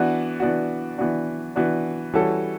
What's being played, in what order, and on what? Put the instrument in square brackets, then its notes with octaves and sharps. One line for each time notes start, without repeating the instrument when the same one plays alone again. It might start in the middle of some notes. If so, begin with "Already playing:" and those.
Already playing: [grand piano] E3 B3 D4 F#4
E3 B3 D4 F#4
E3 B3 D4 F#4
E3 B3 D4 F#4
E3 G3 C#4 F#4 A4